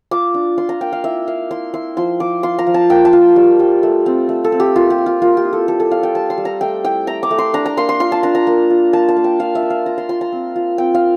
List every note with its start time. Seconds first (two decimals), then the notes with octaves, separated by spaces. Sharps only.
0.11 F4 D6
0.34 D4
0.58 F4 C6
0.69 A#5
0.81 A#3 G5
0.92 F5
1.04 E4 E5
1.27 E4 F5
1.51 E4 C6
1.74 E4 C6
1.97 F3 C6
2.20 F3 D6
2.43 F4 C6
2.59 A#5
2.67 F3
2.74 A5
2.90 A#3 G5
3.05 A5
3.13 F4
3.36 G3
3.59 G3
3.83 A3
4.06 C4
4.29 A3
4.44 A4
4.52 C4
4.60 G4
4.76 A#3 F4
4.90 G4
4.98 A#3
5.06 F4
5.22 A#3 F4
5.37 G4
5.45 E4
5.53 A4
5.68 G3 A4
5.80 A4
5.91 G3 F5
6.03 G5
6.15 G3 A5
6.30 C6
6.38 G3
6.45 A#5
6.61 A3 G5
6.84 E4 G5
7.07 A3 A#5
7.23 D6
7.31 A3
7.38 C6
7.54 D4 A#5
7.66 A#5
7.77 A#3 C6
7.89 C6
8.00 F4 C6
8.12 A5
8.23 D4 A#5
8.35 A#5
8.47 A#3
8.70 F4
8.93 A#3 A5
9.09 A5
9.17 A#3
9.24 G5
9.39 F4 F5
9.55 E5
9.62 F4
9.70 F5
9.86 F4 A#5
9.98 C6
10.09 F4 C6
10.21 A#5
10.32 C4
10.56 F4
10.78 C4 G5
10.94 F5